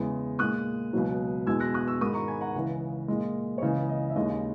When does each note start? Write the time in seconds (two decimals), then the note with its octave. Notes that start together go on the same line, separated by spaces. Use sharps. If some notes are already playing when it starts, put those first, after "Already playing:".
Already playing: E2 C#3 G#3
0.39 A#2 G#3 D#6 F#6
0.93 C#2 B2 F#3
1.47 E2 B2 G#3 E6 G#6
1.60 F#6 A#6
1.74 D#6 F#6
1.87 C#6 E6
2.01 G#2 D#3 G#3 B5 D#6
2.14 A#5 C#6
2.27 G#5 B5
2.41 F#5 A#5
2.55 C#2 C#3 E3
3.08 A#2 G#3 D#5
3.58 C#5
3.62 C#2 C#3 E3 D#5
3.89 D#5
4.10 E5
4.16 D#2 C#3 G#3 D#5